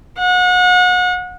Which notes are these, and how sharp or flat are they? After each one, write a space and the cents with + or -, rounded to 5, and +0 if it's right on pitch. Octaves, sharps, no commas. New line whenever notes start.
F#5 -35